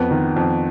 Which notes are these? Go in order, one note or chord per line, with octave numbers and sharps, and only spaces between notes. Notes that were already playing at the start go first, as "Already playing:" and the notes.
Already playing: F2 B3
D#3
F2